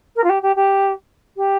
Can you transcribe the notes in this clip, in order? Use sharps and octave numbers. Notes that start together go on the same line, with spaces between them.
A#4
F4
G4
G4
G4
G4